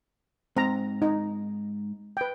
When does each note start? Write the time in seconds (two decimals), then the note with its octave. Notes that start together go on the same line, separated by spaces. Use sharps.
0.57 G#2 C4 A#5
1.02 D#4
2.17 B4 G5